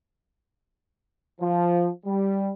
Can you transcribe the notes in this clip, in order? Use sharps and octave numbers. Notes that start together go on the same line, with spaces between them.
F3
G3